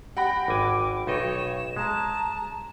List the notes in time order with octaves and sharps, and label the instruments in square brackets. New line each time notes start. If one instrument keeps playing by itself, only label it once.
[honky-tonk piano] F#5 G5 B5 [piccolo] A#6
[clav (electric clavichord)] G#1 G#5 [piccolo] D6
[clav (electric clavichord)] B1 D#4 D#5 [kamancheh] C#5 [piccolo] E7
[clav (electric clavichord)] G#3 [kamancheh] A5 A#5